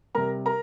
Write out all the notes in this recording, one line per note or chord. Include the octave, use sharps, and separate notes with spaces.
C3 G3 A#4 A#5
A#4 A#5